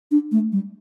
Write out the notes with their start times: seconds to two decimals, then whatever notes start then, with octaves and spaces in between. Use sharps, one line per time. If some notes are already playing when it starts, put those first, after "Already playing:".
0.11 D4
0.32 A3
0.52 G3